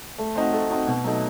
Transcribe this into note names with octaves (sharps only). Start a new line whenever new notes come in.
A3
C4 D#4 F#4
A3
C4 D#4 F#4
B2
F#3 A3 D#4